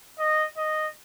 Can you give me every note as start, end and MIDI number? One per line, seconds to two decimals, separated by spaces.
0.19 0.46 75
0.57 0.87 75